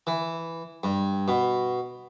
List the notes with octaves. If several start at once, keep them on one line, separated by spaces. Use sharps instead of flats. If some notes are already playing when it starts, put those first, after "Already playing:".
E3
G2
B2